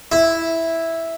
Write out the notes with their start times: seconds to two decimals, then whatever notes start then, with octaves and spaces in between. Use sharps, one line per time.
0.12 E4